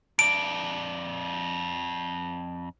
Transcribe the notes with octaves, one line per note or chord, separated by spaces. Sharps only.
F2 D5 D7